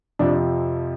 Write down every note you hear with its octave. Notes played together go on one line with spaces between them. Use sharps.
F2 C3 F3 D4